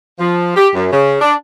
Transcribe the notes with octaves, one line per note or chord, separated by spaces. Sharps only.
F3
G4
F#2
C#3
D4